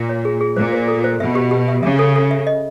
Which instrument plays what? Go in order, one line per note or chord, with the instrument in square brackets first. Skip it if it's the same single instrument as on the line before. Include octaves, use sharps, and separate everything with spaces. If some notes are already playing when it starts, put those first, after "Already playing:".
Already playing: [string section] A#2
[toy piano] C#5
G#4
G#4
[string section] A#2 [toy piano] C5
[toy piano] C5
A4
C5
[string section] B2 [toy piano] E5
[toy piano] G4
G4
E5
[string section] C#3 [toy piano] E5
[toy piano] A4
A4
E5
D#5